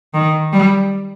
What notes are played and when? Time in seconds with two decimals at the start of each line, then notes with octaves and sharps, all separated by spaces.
0.14 D#3
0.53 G3